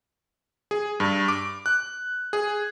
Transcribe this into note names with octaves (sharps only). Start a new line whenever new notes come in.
G#4
G2
D6
F#6
G#4